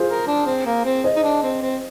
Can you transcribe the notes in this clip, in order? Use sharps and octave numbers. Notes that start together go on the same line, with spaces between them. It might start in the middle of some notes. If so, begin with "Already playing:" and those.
Already playing: F4 G#4 C5
A#4
D4
C4
A#3
C4
C5 D#5
D#4
D4
C4
C4